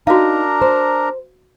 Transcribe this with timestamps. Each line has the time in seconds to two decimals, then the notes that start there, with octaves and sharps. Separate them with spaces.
0.07 D4 D#4 F#4 A#4 F5 A#5
0.62 C5